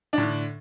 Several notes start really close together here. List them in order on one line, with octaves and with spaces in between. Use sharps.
D4 A2 D3